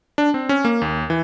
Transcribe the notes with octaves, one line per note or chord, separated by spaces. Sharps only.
D4
C4
C#4
A#3
D#2
E3